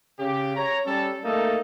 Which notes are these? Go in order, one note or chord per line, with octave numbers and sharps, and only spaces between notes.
C#3 G4
C#5 A#5
G3 C#4 A4
A3 A#3 D#4 A4